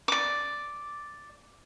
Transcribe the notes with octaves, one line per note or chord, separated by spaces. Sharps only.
D5 D6